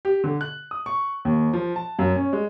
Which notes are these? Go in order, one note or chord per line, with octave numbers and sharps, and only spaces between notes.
G4
D3
F#6
D#6
C#6
D#2
F3
A5
F#2
C#4
G#3